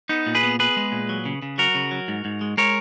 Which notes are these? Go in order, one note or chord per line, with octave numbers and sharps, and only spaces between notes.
B3 D#4
A#2
G#4 B4
B3
B3 G#4 B4
G#3
A#2
F#3
C#3
C#3
F#3 F#4 A#4
C#3
F#3
G#2
G#2
G#3
G#3 A#4 C#5